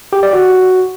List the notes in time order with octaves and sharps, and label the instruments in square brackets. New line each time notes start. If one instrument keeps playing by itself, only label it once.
[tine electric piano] G4
D5
F#4